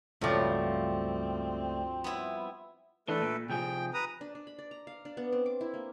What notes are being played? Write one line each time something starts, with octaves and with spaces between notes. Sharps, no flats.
C#2 G2 F3 F#3 A3 C4 D5
B3 E4
E3 A3 D4 A4 B4
A#2
C3 F3 G#4 G5
B4 A#5 D#6
D4
D4
B5
D5
A#5
F5
D4
B3
C4
D6
E4
A#3